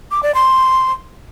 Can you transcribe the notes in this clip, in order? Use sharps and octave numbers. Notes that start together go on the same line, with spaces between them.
D6
D5
C6